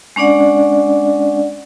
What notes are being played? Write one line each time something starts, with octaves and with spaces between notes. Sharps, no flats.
G#3 C#4 D4 D5 F#5